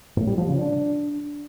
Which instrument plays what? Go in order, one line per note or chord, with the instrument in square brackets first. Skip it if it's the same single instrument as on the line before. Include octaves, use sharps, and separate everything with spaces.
[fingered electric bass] A2
G3
F3
C#3
D4